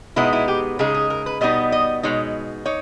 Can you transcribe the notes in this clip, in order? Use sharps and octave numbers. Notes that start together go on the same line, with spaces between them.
B2 G#3 B3 D#4 E4
E4
G4
C#3 G#3 D#4 G#4
G#4
A#4
B4
B2 G3 B3 D#4 D#5
D#5
B2 G#3 D#4 C#5
D#4 C#5